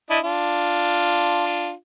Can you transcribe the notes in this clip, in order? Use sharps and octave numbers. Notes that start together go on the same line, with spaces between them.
D4 E4 D#5
D4 F4